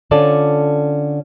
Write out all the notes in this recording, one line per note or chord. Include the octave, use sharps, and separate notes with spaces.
D3 C#4 F4 A4 D5